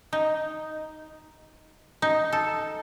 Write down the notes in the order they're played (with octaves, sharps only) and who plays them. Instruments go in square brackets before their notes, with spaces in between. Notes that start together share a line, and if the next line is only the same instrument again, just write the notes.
[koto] D#4
D#4
A4